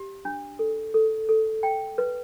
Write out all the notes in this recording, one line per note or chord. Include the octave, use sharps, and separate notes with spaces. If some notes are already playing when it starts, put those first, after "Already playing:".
Already playing: G4
D4
A4
A4
A4
G5
B4